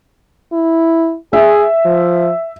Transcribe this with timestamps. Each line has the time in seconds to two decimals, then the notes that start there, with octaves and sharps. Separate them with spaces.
0.53 E4
1.33 G#4 E5
1.85 F3